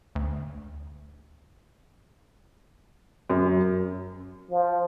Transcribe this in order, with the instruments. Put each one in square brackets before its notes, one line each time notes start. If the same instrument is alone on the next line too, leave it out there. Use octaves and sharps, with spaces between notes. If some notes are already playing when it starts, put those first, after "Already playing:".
[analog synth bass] D2
[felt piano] F#2
[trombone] F3